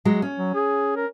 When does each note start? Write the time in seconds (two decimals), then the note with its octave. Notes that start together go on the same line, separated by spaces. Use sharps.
0.05 F#3 G#3 F#4
0.22 C#4
0.39 F#3
0.55 G#4
0.96 A#4